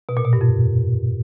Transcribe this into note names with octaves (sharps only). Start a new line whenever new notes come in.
B2
A#2
B2
G2
F2